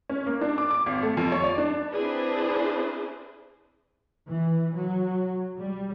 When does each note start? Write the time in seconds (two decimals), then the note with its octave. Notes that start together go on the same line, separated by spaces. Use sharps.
0.09 C#4
0.26 A#3
0.41 D4
0.58 D6
0.71 D6
0.86 G#1
1.02 A3
1.17 F2
1.32 C#5
1.44 D5
1.58 D4
1.92 C4 D4 E4 G#4 B4 C5
4.28 E3
4.74 F#3
5.58 G3